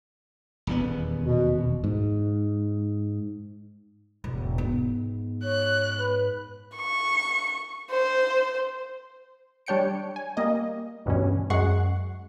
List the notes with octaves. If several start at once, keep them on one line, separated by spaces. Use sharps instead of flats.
D#1 E2 B3
B2
G#2
E1 A2
G#2 B3
C#5 F#6
B4
C#6
C5
G3 D4 C#5 G5 C#7 D7
G#5
G3 A#3 D#5
D2 G2 B2 E3 C#4
F#2 G#3 F#5 C#6 C7 C#7